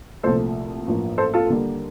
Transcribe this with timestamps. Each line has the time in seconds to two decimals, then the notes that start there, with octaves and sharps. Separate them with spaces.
0.23 C2 A#2 F3 A3 A4 C5
0.87 A1 G2 F3 A#3
1.18 A4 C5
1.34 F4 A4
1.50 D#2 D3 G3 A#3